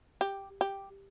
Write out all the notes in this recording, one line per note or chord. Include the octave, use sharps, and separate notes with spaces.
G4
G4